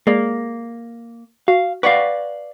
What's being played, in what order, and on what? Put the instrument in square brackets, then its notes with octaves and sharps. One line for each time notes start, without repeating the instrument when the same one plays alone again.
[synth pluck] G#3 G#4 D5 [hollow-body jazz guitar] A#3
[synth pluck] F#4 [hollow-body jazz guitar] F5
[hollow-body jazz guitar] B4 D5 F5 [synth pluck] F#5 C#6